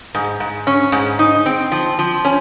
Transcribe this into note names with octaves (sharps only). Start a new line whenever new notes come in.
G#2
G#2
C#4
G#2
D#4
C4
F3
F3
C#4